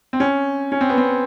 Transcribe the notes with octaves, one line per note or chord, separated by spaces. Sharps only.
C4
C#4
C#4
C4
B3
C4